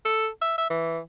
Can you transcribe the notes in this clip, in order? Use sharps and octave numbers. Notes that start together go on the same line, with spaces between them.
A4
E5
E5
E3